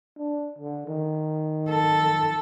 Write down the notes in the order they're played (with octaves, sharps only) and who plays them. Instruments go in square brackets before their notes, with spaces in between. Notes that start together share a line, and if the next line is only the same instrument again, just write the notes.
[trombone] D4
D3
D#3
[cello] A4